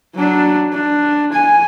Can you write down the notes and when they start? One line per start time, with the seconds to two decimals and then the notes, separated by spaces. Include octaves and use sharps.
0.16 F#3 D4
0.74 D4
1.33 G#5